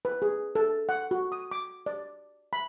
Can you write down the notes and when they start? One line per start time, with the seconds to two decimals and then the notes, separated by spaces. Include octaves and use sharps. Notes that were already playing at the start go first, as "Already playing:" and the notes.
0.05 B4
0.22 G#4
0.55 A4
0.89 F#5
1.11 F#4
1.32 D#6
1.51 D6
1.86 D5
2.53 B5